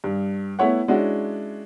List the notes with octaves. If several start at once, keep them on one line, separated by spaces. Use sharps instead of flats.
G2
A3 B3 E4 C#5 F#5
G#3 C#4 D4 E4 F#4